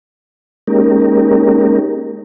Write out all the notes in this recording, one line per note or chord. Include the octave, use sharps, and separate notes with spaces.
G#3 A#3 C#4 D#4 G4 A#4